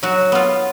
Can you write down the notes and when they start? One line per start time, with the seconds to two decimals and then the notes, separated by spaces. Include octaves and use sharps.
0.03 F#3 F#4
0.32 B3 F4